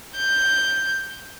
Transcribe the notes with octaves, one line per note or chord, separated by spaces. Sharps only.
G6